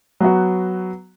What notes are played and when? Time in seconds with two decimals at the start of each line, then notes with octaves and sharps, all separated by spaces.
0.20 F#3 B3 F#4